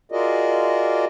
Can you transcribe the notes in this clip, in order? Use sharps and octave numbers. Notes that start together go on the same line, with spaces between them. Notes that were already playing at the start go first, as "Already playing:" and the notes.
F4 F#4 G#4 A#4 D5 D#5